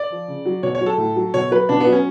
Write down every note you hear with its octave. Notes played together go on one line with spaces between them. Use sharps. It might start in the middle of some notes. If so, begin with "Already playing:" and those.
Already playing: D5
F3
C#3
F#3
B2 C#5
C#5
F#3
A4
A2
F#3
B2 C#5
F#3 B4
B2 D4
B3
F#3
C#4